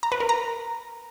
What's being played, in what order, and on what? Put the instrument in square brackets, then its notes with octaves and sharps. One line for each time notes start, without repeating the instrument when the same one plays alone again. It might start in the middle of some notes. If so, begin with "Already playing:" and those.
[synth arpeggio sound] A#5
B4
A#4
A#5